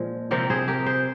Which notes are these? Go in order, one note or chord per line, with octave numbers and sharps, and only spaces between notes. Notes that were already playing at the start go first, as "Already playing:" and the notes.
Already playing: A#2 F3 G#3
C3 F3 C4 G4 A#4
G#4 C5
G4 A#4
G#4 C5